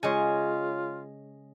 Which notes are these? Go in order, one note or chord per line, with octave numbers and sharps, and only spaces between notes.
C#3 G#3 F4 C#5 D#5 G#5